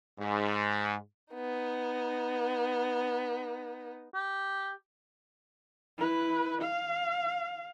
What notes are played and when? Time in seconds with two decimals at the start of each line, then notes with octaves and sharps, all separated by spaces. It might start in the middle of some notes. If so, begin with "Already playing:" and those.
0.19 G#2
1.33 B3 D#4
4.14 G4
5.98 E4 B4
6.61 F5